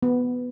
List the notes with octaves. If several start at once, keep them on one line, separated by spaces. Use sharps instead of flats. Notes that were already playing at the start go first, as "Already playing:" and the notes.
B3